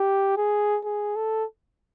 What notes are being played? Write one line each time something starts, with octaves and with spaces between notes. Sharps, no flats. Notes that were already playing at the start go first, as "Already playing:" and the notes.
Already playing: G4
G#4
G#4
A4